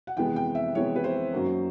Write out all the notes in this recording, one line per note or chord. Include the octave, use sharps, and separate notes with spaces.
F#5
F2 C3 E3 G#3 B3 G5
G5
E5
F2 C3 E3 G#3 B3 C#5
B4
C5
F#2 D#3 F#3 A#3